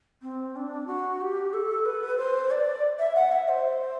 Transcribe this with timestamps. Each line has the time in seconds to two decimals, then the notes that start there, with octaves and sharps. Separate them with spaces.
0.22 C4
0.56 D4
0.87 F#4
1.21 G4
1.53 A4
1.85 B4
2.18 C5
2.51 D5
2.99 E5
3.15 F#5
3.32 E5
3.48 C5